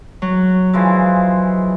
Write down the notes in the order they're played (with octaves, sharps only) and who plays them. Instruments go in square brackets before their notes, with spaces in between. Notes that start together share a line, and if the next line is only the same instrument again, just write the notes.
[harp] F#3
[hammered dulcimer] E3 F3 G#3